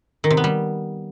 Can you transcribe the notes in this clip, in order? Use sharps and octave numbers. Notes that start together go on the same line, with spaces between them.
D#3
C3
B3
G3